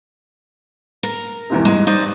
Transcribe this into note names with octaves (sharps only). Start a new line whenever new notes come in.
A#4
E2 G#2 C3
G2 G#3
D#4 C5 D5